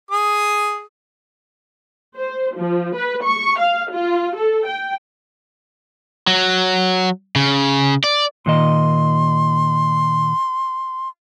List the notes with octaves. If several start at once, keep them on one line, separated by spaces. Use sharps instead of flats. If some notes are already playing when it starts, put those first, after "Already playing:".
G#4 D#6
C5
F3
B4
C#6
F5
F4
A4
G5
F#3
C#3
D5
A#2 D#3 D#5 C6